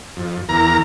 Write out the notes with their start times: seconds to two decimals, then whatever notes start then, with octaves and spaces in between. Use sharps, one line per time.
0.17 F2
0.49 E2 A#4 A#5